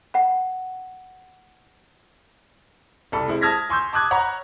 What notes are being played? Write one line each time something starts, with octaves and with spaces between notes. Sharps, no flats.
F#5 B5
C2 A4 B5
G#3 C4 E4
A5 D#6 F6 G#6 A#6 B6
G#5 C6 C#6 E6 G6
A5 D6 D#6 F#6 G#6
C#5 F#5 A#5 B5